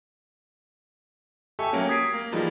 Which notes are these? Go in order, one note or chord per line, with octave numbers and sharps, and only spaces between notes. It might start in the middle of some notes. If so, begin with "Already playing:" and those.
G4 A4 E5 G#5 C#6
F#3 A#3 C#4 G4
D#6 G#6 B6 C7 D7
A#3
E3 F3 G3 G#3 A#3 D#4